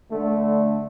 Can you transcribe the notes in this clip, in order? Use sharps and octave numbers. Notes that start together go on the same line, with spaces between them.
D3 A3